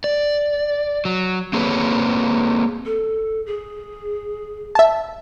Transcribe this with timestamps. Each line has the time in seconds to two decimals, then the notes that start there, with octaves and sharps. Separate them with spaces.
0.04 D5
1.05 F#3
1.53 A#3 C4 G#4 B4 C#5
2.85 A4
3.46 G#4
4.75 E5 A5